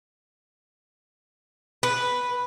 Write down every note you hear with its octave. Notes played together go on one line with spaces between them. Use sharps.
B4